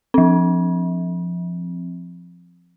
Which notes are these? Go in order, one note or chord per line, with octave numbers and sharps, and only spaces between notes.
F3 C4